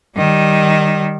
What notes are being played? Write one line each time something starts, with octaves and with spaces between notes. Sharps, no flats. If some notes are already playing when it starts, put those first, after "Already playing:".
D#3 G3